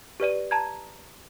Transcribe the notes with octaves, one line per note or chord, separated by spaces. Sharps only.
G4 B4 D5 D#7
A5 A#5 G#6